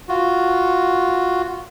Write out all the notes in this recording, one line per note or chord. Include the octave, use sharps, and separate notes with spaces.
F4 F#4